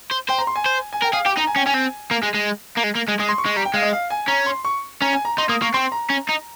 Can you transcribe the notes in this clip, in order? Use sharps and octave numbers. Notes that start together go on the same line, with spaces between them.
C5
C5 G5
A#5
C6
G#5
C5
G#5
A#4 G5
G#4 F5
G4 G5
D#4 A#5
G#5
C#4 G5
C#4 G#5
C4
A#3
G#3
G#3
A#3
G#3
A#3
G#3
G#3 D#6
C6
C#6
G#3
G3 A#5
G5
G#3 F5
D#5
F5
G#5
C#4 A#5
C6
C#6
C#4 A#5
G#5
A#5
D#4 C6
A#3 D#6
A#3 C#6
C4 C6
A#5
C#4
D#4